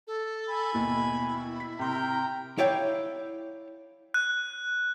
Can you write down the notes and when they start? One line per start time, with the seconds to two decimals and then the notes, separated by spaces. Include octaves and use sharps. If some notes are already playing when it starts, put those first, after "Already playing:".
0.07 A4
0.49 G#5 B5
0.74 D#2 B2 E4
1.60 B6
1.79 C3 A#4 G5 C6
2.09 A#5
2.58 E4 C#5 D5 F5 G5
4.14 F#6